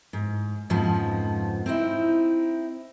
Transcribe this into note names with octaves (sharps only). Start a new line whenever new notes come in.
G#2
F2 G#2 C#3 F3 B3
C4 D#4 E4